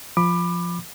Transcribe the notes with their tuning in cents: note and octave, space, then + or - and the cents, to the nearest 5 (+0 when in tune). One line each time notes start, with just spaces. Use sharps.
F3 +0 B5 +0 D6 +20